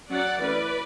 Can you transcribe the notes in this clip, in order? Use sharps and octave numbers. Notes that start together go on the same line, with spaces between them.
F#3 C#4 D5 F#5
E3 A3 C#4 B4 D5